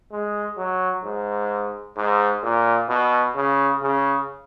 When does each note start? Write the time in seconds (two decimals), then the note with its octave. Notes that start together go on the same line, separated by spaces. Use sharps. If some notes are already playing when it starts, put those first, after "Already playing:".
0.12 G#3
0.58 F#3
1.04 G#2
1.97 G#2
2.43 A#2
2.89 B2
3.35 C#3
3.82 C#3